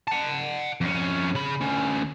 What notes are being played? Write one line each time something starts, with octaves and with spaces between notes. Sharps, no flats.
F#5 A5
F2 C#4
C#3 B5
D2 C#4